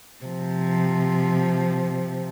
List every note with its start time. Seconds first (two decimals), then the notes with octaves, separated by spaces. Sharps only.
0.25 C3 F3